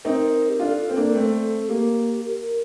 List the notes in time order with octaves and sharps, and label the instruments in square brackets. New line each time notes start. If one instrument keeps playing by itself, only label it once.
[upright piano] C4 D#4 [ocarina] A#4
[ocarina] G4
[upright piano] D4 F4 [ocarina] A#4
[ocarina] A4
[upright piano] C4
A#3 D4
A3 C4
[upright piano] A#3 [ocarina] G4
[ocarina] A#4